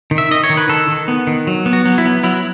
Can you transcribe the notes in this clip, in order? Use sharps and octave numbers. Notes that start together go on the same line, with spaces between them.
D#3
E5
D#3 D#5
C#5
D#3
B4
D#3 A4
D#3
B3
D#3
F#3
B3
F#4
F#3
E4
B3
F#3 E4